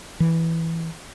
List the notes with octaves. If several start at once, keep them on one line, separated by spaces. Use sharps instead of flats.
E3